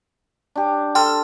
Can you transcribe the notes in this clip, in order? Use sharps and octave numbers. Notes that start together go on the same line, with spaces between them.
D4 G4
A4 G5 C6 F6